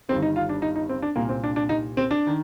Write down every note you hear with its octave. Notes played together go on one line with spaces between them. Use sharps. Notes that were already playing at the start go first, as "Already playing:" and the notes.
G1 G2 D#3 C4
D#4
F4
D4
D#4
D#4
C4
D4
C2 A#2 A#3
C4
D4
D4
D#4
C4
D4
D#3